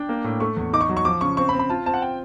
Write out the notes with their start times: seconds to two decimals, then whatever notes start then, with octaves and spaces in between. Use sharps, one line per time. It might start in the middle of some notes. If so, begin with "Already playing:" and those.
Already playing: D4 G5
0.09 A#3
0.24 A2
0.40 A3 C#6
0.57 E2
0.73 D#4 D6
0.81 C#6
0.89 F#3
0.97 C#6
1.05 F3 D6
1.21 C#3 C#6
1.37 C4 C#6
1.49 B5
1.53 C4
1.59 B5
1.70 F4 A5
1.86 C4 A5
1.94 F#5
2.02 G5